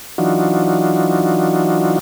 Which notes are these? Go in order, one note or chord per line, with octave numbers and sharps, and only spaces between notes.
E3 F#3 D4 D#4 F4 F#4